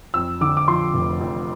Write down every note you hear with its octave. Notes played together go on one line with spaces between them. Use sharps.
F2 E6
D3 D6
D6
F3 C6
F1
F2